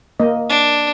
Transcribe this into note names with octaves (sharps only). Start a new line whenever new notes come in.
A#3 D#5
D4